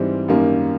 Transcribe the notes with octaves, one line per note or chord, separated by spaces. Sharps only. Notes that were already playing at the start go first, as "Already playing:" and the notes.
Already playing: G#2 E3 G3 C4
F#2 D#3 G3 A#3